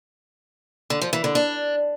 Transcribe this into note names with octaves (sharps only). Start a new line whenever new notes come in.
D3
F3
E3
D3
D4